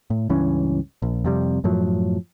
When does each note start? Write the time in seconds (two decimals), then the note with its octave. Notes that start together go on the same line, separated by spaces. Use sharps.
0.10 A2
0.30 C#2 G2 E3 C#4
1.02 A#1
1.25 F2 C3 G3
1.64 F#2 A2 F3 F#3